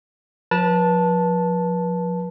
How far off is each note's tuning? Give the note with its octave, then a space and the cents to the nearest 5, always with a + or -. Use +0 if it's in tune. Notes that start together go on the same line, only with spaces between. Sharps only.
F3 +30 B4 -35 A5 +0